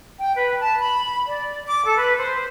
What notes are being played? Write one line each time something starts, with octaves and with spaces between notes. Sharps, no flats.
G5
B4
A5
B5
D5
D6
A4
B4
C5